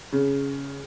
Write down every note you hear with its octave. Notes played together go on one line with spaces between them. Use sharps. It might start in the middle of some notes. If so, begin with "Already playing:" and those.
C#3